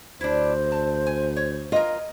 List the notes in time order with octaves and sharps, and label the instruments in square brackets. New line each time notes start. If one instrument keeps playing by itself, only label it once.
[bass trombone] D2 [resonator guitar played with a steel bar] D4 E4 [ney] C5
[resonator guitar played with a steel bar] A5
G#5
C#5
[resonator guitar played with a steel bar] F4 A#4 [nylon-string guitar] D#5